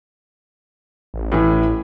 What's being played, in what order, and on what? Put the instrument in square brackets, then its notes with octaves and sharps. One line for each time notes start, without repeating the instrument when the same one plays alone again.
[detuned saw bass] A1
[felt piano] A2 E3